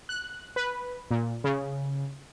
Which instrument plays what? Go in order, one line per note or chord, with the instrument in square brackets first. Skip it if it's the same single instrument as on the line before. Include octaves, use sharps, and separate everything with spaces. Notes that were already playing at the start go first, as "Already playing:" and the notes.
[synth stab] F#6
B4
A#2
C#3